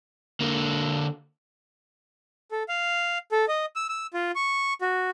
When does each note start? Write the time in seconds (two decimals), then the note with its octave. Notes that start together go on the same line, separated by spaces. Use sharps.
0.40 D3 A#3
2.51 A4
2.69 F5
3.32 A4
3.48 D#5
3.76 E6
3.89 E6
4.14 F4
4.35 C#6
4.81 F#4